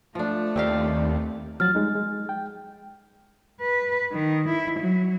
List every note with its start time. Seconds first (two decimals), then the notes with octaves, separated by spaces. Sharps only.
0.15 F3 A3 D4
0.56 D#2 C4 G4 D5 F5
1.60 F3 F#3 F6 A6
1.75 G3 G#3 D#4
1.96 G#3
2.29 G5
3.61 B4
4.13 D#3
4.49 E4
4.80 F#3